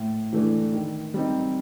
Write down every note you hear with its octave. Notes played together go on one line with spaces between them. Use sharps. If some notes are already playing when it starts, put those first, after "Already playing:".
Already playing: A2
E3 A3 D4
D#3
G3 C4 D#4